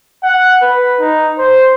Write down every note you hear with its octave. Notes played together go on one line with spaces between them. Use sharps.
F#5
B4
D#4
C5